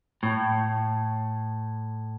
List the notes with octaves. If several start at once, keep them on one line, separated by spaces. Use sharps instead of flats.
A2